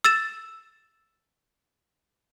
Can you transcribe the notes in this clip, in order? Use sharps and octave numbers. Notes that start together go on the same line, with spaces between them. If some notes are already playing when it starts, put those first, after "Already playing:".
E6 A6 E7